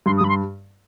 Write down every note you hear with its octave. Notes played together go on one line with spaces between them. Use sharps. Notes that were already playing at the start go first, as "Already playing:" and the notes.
G2 C6
D#6
G2 B5
C6